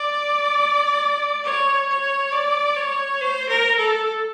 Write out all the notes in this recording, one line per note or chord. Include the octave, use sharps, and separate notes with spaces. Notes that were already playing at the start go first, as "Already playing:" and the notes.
Already playing: D5
C#5
C#5
D5
C#5
C5
A#4
A4